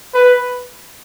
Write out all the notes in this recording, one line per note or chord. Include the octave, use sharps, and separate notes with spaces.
B4